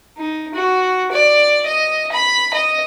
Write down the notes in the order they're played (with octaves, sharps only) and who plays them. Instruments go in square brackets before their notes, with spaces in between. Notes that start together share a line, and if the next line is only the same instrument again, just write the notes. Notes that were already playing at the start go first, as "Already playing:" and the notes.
[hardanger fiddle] D#4
F#4
D5
D#5
B5
D#5